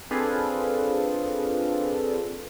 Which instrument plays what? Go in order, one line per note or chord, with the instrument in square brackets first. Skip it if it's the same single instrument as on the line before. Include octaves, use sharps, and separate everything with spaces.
[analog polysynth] C4 D4 F4 G#4 A4 B4